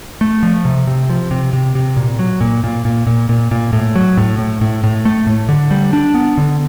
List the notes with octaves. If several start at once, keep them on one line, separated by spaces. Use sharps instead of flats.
A3
F3
C3
C3
F3
C3
C3
C3
A#2
F#3
A#2
A#2
A#2
A#2
A#2
A#2
A2
F#3
A2
A2
A2
A2
A3
A2
D3
G3
D4
B3
D3